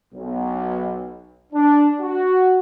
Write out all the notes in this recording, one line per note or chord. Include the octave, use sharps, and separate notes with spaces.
B1
D4
F#4